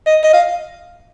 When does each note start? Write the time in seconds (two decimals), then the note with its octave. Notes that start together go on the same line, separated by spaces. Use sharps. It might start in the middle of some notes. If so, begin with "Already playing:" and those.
0.06 D#5
0.23 D#5
0.34 F5